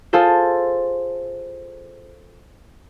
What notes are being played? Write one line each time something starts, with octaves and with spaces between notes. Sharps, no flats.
F4 G#4 A4 C5